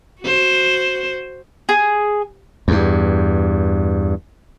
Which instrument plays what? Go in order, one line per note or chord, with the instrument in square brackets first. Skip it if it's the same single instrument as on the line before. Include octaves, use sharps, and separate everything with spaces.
[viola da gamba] F#4 C5
[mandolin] G#4
[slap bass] E2 G2